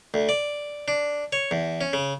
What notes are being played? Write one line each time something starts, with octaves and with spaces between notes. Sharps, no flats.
D2
D5
D4
C#5
E2
C#4
C#3